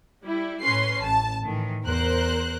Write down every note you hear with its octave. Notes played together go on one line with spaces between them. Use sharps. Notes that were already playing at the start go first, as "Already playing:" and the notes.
G3 E4
A2 C#4 B4 C#5 C6 C7
A1 A5
A2 D#3 E3
E2 A#4 C5 F#6